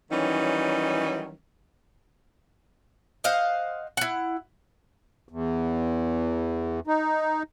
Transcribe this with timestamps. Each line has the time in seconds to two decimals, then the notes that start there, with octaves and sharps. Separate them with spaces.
0.11 D#3 E3 F#3 G3 C#4 D#4
3.24 C5 D#5 F5 F#5
3.97 E4 F#5
5.29 E2
6.87 D#4